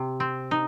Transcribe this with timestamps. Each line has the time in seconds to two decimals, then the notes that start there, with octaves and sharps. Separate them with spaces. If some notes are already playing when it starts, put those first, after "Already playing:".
Already playing: C3
0.20 C4
0.51 D#4